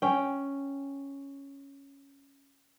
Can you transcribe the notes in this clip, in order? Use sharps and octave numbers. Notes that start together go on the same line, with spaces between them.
C#4 G5